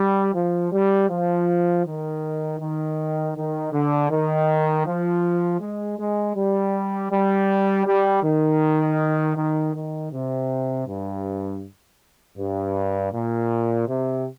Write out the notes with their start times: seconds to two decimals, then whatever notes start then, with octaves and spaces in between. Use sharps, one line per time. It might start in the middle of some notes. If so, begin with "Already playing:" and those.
Already playing: G3
0.35 F3
0.72 G3
1.10 F3
1.85 D#3
2.60 D#3
3.36 D#3
3.73 D3
4.10 D#3
4.86 F3
5.60 G#3
5.99 G#3
6.36 G3
7.12 G3
7.86 G3
8.24 D#3
9.36 D#3
9.75 D#3
10.12 C3
10.87 G2
12.38 G2
13.13 A#2
13.88 C3